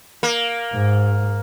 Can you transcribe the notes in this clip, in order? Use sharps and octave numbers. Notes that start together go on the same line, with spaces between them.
A#3
G#2